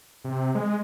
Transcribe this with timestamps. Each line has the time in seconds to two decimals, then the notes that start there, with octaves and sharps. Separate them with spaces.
0.24 C3
0.55 G#3